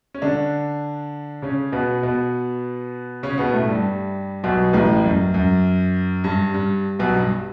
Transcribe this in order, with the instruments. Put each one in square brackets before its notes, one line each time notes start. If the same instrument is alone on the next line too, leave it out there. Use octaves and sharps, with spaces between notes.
[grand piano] C#4
D3 D4
C#3 C#4
B2 B3
B2 B3
C#3 C#4
B2 B3
A2 A3
G2 G3
B1 B2
A1 A2
F#2
F#2
G2
G2
B1 B2
G2